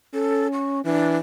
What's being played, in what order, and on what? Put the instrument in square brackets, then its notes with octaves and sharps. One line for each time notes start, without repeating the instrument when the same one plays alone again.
[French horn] C#4 [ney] A4
[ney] C#6
[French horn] E3 [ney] D4